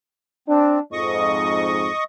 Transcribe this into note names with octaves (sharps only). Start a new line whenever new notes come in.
C4 D4
F2 G#2 D#5 C#6 D#6